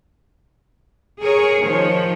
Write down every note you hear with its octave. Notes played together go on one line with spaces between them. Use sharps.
G#4 A#4 C#5
D#3 F3 C#5